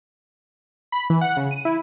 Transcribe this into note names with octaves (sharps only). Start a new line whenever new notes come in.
B5
E3
F#5
C#3
D#7
E4